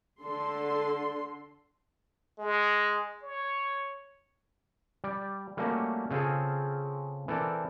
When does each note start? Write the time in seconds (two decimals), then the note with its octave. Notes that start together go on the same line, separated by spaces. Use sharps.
0.21 D3 A4 C6
2.39 G#3
3.23 C#5
5.04 G3 D5
5.57 G3 A3 A#3 C#4 F#4
6.11 C#3 C4 F4 G#4 A4
7.28 E3 C4 A4 A#4 D5